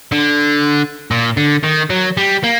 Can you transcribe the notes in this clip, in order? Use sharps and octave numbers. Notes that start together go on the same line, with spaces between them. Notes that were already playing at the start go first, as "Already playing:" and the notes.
D3
A#2
D3
D#3
F#3
G3
A#3